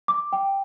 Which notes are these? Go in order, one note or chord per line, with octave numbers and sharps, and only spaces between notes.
D6
G5